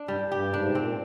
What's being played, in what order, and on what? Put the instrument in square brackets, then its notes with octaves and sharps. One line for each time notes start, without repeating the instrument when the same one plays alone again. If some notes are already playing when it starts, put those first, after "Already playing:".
Already playing: [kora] D4
[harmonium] G2 [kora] G3
[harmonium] G2
[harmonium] G2 [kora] G4
[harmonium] G#2 [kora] D4
[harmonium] C3
[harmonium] A#2 [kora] C4